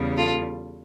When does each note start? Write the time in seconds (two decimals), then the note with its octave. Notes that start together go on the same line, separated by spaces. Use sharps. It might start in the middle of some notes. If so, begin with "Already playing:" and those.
Already playing: E2 C#3 G3
0.16 F4 A4